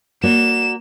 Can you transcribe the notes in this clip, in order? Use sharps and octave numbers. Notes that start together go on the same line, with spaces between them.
A#3 F#4 D5 E7